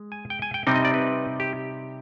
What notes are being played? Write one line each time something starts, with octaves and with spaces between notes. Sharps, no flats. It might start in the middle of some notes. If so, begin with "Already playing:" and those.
Already playing: G#3
G#5
G5
G#5
G5
C3 G3 C4 D#4 G5
D#5
D5
B4
G4